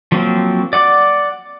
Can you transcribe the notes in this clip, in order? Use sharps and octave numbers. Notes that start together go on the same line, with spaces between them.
F3 F#3 A#3 C4
D5 F#5 D6